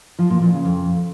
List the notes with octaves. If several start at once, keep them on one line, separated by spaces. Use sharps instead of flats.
F3
A#2
A#2
C#3
F2